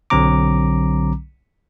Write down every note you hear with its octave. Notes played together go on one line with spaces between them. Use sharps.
B1 D3 F#3 C4 A#5 D6